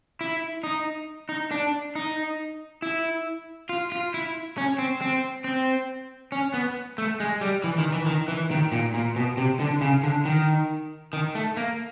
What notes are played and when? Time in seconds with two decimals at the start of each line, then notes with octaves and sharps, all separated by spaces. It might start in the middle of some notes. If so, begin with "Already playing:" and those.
0.21 E4
0.63 D#4
1.29 D#4
1.51 D4
1.95 D#4
2.82 E4
3.69 F4
3.92 F4
4.14 E4
4.58 C#4
4.78 C4
5.01 C4
5.44 C4
6.32 C#4
6.54 B3
6.98 A3
7.20 G#3
7.41 G3
7.64 E3
7.78 D#3
7.92 E3
8.06 D#3
8.28 E3
8.51 D#3
8.72 A#2
8.94 A#2
9.16 B2
9.37 C3
9.60 D3
9.81 C#3
10.03 D3
10.25 D#3
11.13 D#3
11.35 A3
11.57 A#3